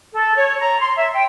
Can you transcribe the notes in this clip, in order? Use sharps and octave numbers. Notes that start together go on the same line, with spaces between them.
A4
C#5
A#5
C6
E5
G5